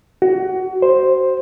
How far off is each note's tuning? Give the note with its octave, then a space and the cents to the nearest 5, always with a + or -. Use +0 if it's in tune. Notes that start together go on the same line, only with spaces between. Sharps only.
F#4 +25
C5 +5